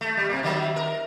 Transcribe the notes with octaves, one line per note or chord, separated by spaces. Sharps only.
A3
G3
C3 A#3
D#3 F#3 E5
A#4